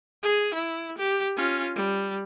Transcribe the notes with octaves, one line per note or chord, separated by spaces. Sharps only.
G#4
E4
G4
C#4 F4
G3